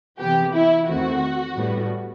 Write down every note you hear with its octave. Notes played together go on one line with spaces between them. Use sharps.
C3 E3 B3 G4
E4
E2 D#3 A3 C4 F#4
A2 G3 B3